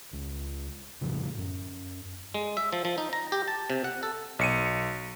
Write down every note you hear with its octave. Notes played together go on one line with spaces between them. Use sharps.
C#2
F2 A2 C#3 F3
F#2
G#3
E5
F3
F3
D#4
A#5
G4
A5
C3
F#5
A4
B1 C#7 D#7